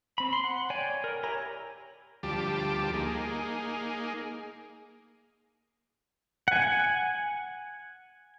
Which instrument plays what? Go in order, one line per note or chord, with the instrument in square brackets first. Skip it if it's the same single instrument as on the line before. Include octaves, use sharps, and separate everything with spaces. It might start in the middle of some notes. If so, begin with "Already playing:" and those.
[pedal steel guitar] C4 B5
C6
F#5
C#5 D5 G5 G#5
A#4
E4 G4 C#5 G#5 A#5
[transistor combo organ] D2 F3 G3 G4 A5 D6
A#3 D#4 G#4
[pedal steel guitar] F#5 G#5